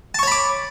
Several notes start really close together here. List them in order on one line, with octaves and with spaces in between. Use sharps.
A5 C#6 C#5 B5 D6